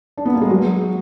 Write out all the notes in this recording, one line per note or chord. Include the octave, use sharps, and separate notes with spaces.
D4
B3
A#3
G#3
F#3